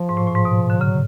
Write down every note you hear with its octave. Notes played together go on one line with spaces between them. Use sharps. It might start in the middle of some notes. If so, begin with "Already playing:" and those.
Already playing: F3
G#2
A2
A2
G#2
B2
D3
C#3 F#3